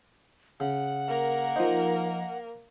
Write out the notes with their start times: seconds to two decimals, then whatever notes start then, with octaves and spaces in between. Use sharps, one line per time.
0.60 C#3 F#5
1.08 A#3 A#4
1.56 F3 D#4 C5